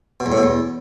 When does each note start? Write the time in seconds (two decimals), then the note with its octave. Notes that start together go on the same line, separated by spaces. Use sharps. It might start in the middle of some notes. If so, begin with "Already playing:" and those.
0.20 B2
0.26 E2
0.32 A2
0.37 B2
0.43 E2